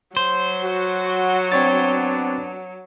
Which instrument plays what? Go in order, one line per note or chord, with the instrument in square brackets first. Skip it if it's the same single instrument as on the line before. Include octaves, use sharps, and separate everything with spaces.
[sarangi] F#3 [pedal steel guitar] C5
[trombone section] F#4
[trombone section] B3 D4 [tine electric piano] C4 C#5 A6